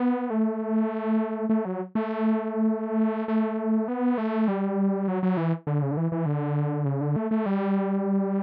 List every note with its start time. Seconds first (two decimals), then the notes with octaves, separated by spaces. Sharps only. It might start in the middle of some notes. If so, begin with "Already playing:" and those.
Already playing: B3
0.30 A3
1.49 A3
1.65 F#3
1.95 A3
3.28 A3
3.88 B3
4.18 A3
4.48 G3
5.08 F#3
5.23 F#3
5.37 E3
5.67 D3
5.82 C#3
5.91 D3
5.97 E3
6.12 E3
6.26 D3
6.85 C#3
7.01 D3
7.16 A3
7.31 A3
7.46 G3